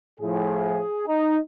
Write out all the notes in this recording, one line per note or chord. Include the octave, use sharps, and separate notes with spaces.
A2 F3 G#4
D#4